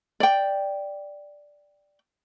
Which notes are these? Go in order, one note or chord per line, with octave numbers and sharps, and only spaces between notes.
D5 G5